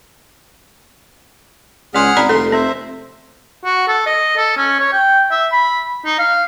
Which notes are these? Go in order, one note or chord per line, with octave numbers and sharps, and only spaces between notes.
C#2 G#4 D5 F#5 C6 F6
G#1 D5 A#5 B5
F1 A4 C6
C4 C5 E5
F#4
A4
D#5
A4
C#4
C#5
G5
E5
B5
D#4
F5